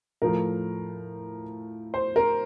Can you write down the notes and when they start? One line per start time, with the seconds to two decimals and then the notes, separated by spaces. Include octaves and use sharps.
0.22 A2 F3 A3 A#4
1.94 C5
2.16 A#4